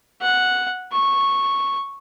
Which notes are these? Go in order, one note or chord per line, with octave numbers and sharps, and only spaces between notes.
F#5
C#6